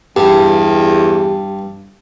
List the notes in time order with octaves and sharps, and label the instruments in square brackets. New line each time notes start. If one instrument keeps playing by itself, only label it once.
[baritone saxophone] E2 [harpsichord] G2 [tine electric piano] G4